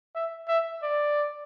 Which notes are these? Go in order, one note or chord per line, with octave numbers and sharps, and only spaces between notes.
E5
E5
D5